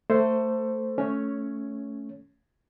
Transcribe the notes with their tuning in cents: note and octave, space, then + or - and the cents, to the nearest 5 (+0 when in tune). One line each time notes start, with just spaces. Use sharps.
A3 +20 A4 +20 C5 +0
A3 +0 C#4 +5 C#5 +0